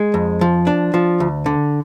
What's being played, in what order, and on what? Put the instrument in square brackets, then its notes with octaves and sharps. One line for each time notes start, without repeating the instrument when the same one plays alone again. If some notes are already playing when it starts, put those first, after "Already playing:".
Already playing: [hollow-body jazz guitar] G#3
F2
F3
D4
F3
D2
D3